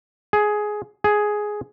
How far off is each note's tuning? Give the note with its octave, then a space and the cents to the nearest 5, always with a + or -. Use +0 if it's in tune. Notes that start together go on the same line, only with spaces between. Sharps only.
G#4 +10
G#4 +5